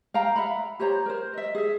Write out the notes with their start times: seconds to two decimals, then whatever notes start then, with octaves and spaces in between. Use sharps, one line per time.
0.14 F5 G5 A#5
0.36 E5 F#5 A#5 B5
0.79 G4 C5 C#5 A#5
1.06 A#4 C5
1.33 D#5 E5
1.55 G#4 E5